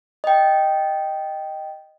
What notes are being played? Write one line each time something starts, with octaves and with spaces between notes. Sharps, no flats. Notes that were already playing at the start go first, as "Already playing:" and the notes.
D#5 G5